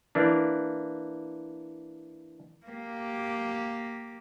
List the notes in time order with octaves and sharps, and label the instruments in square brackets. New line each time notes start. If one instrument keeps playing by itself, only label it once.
[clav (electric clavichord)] E3 A#3 D4
[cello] A#3 G4